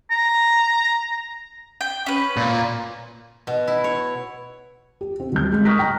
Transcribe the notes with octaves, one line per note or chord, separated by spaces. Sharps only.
A#5
G5
C#4 B4
A#2
B2
E4
C#5
G4
C4
D2 G3 G6
G#3
C#6 D#6 F6 F#6 A#6 B6
G5 A#5